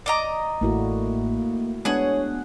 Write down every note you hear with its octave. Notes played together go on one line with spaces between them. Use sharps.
D5 D#5 A#5
A1 A2 A3 A#3 E4 F#4
G#3 B3 D4 G#4 C#5 F#5